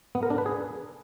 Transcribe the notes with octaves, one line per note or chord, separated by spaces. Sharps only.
B3
A#4
D4
B4
G#4